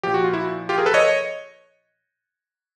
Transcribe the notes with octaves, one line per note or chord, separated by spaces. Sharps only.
A#2 F3 G4
F#4
F4
E4 F#4
F4 G4
G#4 A#4
A4 B4
C#5 D#5